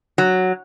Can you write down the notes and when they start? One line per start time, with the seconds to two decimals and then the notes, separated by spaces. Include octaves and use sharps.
0.18 F#3